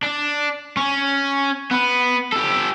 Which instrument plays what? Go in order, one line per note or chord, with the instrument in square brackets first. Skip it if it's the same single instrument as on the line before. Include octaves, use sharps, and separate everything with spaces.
[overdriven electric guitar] D4
C#4
B3
G4 A4